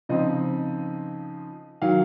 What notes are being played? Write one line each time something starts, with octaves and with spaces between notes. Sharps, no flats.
C#3 F3 C4 D#4 D#5
D#3 F#3 F5